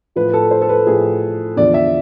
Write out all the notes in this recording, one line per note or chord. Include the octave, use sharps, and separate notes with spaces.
A2 F3 B4
A4
C5
A4
B4
A2 F3 G#4
E2 D3 F3 D5
E5